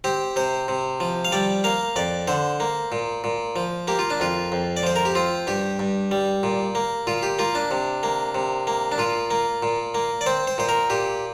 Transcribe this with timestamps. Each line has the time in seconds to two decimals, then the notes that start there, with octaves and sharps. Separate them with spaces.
0.04 C4 G4
0.36 C3 C5
0.68 C3
1.00 F3
1.25 F5
1.32 G3 D5
1.64 A#3 F5
1.96 F2 D5
2.27 D3 C5
2.60 A#3
2.92 A#2
3.24 A#2
3.56 F3
3.88 A#3 G4
3.99 F4
4.10 D4
4.20 F2 F4
4.52 F2
4.77 D5
4.83 F3 C5
4.96 A#4
5.05 G4
5.15 C4 F4
5.47 G2 G4
5.79 G2
6.11 G3
6.43 A#2
6.75 A#3
7.07 A#2 F4
7.23 G4
7.39 A#3 F4
7.55 D4
7.71 C3
8.03 A#3
8.35 C3
8.67 A#3
8.92 D4
8.98 A#2 F4
9.31 A#3
9.63 A#2
9.95 A#3
10.21 D5
10.26 C4 C5
10.47 C5
10.58 A#2 C5
10.69 A#4
10.90 A#2 G4